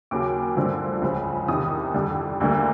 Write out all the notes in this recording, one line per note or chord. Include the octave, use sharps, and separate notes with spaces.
D#2 C#3 F#3 D6
G2 D3 F3 A3 C4
C#2 C#3 F3
E2 C3 D#3 D#6
F2 D3 G3
D2 D3 G3 A#3